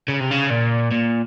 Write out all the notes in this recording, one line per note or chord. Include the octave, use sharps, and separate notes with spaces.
C#3
C3
C#3
A#2
A#2